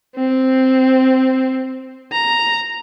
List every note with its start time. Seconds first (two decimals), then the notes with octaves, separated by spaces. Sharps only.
0.16 C4
2.12 A#5